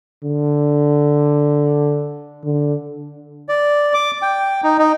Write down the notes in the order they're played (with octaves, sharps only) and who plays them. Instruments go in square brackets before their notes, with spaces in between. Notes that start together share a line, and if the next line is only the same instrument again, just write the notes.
[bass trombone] D3
D3
[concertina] D5
D6
G5
D#4
D#4